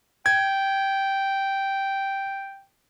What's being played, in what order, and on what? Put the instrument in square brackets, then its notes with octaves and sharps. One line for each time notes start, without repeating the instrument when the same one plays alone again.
[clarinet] G5 [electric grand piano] G#6